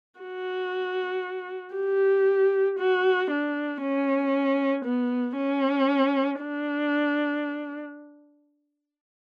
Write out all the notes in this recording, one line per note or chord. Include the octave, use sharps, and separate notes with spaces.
F#4
G4
F#4
D4
C#4
B3
C#4
D4